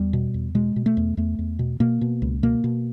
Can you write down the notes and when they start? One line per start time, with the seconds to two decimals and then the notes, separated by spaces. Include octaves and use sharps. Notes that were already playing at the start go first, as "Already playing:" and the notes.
Already playing: E2 G3
0.13 B2
0.34 E2
0.55 B2 G#3
0.76 B2
0.86 A3
0.97 E2
1.17 E2 A3
1.39 E2
1.59 B2
1.80 B2 A#3
2.01 B2
2.22 C#2
2.43 B2 A#3
2.64 B2